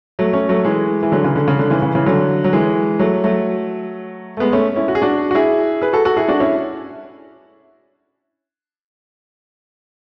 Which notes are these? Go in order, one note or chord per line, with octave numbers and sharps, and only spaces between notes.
F#3 A3
A3 C#4
F#3 A3
E3 G#3
E3
D3 F#3
C#3 E3
D3
C#3
D3
C#3 E3
C#3 E3
C#3 E3
D3 F#3
F#3
E3 G#3
F#3 A3
F#3 A3
A3
G#3 B3
A3 C#4
C#4 E4
F#4
G#4
D4 F#4
F#4
E4 G#4
G#4 B4
F#4 A4
F#4 A4
E4 G#4
D4 F#4
C#4 E4